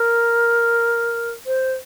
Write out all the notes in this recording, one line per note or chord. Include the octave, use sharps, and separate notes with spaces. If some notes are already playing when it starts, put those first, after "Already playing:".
Already playing: A#4
C5